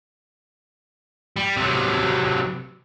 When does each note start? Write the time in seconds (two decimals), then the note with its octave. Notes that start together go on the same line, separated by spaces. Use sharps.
1.36 G3
1.57 C3 F#3